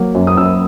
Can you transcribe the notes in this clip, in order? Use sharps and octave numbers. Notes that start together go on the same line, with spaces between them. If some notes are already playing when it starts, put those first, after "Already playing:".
Already playing: F#3 A#3
F#2
D#6
F#2 E6